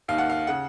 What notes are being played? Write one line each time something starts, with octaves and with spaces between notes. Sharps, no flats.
D#2 D#3 F5
F#5
F5
C#3 F#5